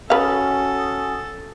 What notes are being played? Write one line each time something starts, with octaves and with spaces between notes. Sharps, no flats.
C#4 F#4 A4 B4 F5 D#6